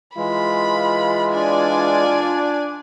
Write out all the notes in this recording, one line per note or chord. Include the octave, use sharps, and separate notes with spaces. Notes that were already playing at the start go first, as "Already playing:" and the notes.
E3 G#3 F4 B5
D4 D5 G#5